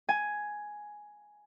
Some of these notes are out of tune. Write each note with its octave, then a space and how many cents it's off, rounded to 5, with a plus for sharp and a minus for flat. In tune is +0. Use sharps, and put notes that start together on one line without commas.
G#5 +5